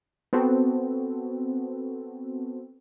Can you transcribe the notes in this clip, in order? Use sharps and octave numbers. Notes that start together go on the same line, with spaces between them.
B3 C4 F#4 A4